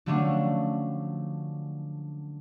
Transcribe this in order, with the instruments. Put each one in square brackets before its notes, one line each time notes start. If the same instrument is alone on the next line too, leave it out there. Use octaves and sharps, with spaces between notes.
[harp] D3 F3 F#3 A3 C#4 D4